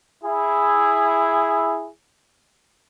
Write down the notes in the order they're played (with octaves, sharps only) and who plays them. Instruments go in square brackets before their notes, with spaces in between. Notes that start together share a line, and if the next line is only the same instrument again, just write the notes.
[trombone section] E4 G#4